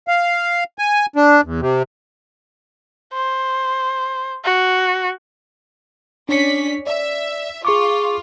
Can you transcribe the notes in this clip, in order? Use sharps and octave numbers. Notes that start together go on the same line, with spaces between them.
F5
G#5
D4
E2
C3
C5
F#4
C#4 D4 D5 B6 C#7
D5 E5
F4 G#4 C#6 D6